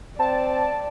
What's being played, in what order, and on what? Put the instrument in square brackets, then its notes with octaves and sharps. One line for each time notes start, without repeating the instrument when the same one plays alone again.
[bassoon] C4 [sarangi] D5 [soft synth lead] A5